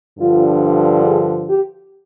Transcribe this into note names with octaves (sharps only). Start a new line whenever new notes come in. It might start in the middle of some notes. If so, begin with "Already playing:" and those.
G2 D3 F3 F4
G#4
G4